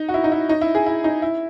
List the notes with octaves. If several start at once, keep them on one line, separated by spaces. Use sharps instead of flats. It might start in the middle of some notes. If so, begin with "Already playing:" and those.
Already playing: D#4
F#4
E4
D#4
E4
D#4
E4
G#4
E4
D#4
E4